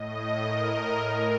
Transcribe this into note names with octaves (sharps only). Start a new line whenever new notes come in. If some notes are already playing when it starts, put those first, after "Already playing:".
Already playing: A2 D#5
A#4
A2 A#4